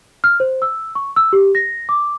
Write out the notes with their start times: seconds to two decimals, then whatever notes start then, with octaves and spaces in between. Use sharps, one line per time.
0.24 F6
0.40 C5
0.62 E6
0.95 C#6
1.16 E6
1.33 G4
1.55 A#6
1.89 D6